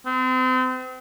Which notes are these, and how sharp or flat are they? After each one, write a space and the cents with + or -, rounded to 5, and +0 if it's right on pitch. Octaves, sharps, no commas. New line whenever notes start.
C4 -35